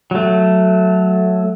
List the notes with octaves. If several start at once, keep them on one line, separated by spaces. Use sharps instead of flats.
F#3 A3